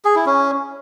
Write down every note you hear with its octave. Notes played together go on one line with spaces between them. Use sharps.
G#4
E4
C#4